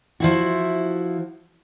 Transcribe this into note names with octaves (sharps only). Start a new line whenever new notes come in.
F3 E4 F#4